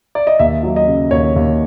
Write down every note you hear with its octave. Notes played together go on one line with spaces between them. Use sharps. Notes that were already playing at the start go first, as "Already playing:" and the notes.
D5
D#5
D#2 E5
F#3
D#5
C#3
D#2 C#5
D#2